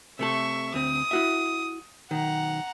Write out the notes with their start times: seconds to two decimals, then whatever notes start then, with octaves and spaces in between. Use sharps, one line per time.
0.19 C3 A3 A4 E5 C#6
0.74 D2 C4 D#6
1.11 E4 F#4 E5
2.11 B1 D#3 F#5 A#5